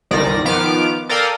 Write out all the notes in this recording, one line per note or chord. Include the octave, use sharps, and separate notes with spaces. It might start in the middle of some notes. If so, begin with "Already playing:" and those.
G1 C2 D#3 D5 A#6
D#3 F3 B3 D6 F6 D7
A4 A#4 D5 F5 G5 D#6